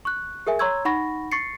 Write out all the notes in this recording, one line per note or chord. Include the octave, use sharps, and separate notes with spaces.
C#6 F#6
G#4 A#4 E5 G#5
C#5 A#5 C6 C#6 E6 G#6
D#4 F#5 B5 C#6 A#6
C#6 A6 C7 C#7